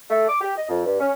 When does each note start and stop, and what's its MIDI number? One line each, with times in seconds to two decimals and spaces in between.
0.10 0.28 57
0.28 0.40 86
0.41 0.53 67
0.56 0.68 75
0.69 0.85 41
0.86 0.98 43
1.00 1.11 61